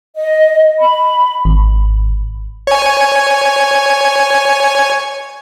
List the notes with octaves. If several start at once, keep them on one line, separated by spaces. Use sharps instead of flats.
D#5
B5
G#1
C#5 G#5